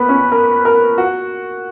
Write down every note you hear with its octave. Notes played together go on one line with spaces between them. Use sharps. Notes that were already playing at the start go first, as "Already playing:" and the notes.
Already playing: A#3 B3 B4
C#4
A#4
A#4
F#4